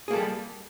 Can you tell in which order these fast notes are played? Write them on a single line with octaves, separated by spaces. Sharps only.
G#4 A#3 A4 G3